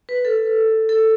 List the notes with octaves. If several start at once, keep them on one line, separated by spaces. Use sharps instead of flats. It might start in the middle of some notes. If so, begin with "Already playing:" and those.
B4
A4
A4